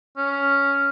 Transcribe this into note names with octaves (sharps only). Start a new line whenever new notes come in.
C#4